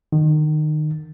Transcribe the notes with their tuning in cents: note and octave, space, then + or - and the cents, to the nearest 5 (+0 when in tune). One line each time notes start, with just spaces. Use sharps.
D#3 -25